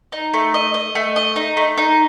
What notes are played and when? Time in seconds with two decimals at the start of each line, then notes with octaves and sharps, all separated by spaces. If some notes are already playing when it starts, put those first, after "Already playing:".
0.12 D#4
0.34 A3
0.54 D#5
0.74 D#5
0.95 A3
1.16 D#5
1.36 D#4
1.57 A3
1.77 D#4